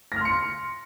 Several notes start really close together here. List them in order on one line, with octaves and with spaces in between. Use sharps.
A#6 F6 C6 C#7